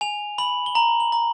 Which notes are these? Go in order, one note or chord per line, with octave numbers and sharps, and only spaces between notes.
G#5 F7
B5 F#7
G7
A#5 F#7
F#7
A#5